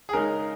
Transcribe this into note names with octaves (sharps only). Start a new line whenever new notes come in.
G#4
C#3 G#3 D#4 A#4